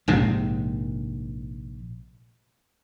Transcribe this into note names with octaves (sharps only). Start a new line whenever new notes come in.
A#1 G#2 C3